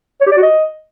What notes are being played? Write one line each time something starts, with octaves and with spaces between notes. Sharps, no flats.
C#5
G4
D5
F#4
D#5